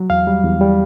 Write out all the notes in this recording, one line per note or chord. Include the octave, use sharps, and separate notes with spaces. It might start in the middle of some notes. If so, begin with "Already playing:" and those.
Already playing: F#3
E2 F5
G3
E2
G3